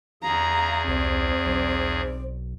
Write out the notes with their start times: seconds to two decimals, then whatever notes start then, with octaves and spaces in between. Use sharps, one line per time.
0.23 E2 G#4 F5 A#5
0.88 C2 C4 C5 D5
1.46 B1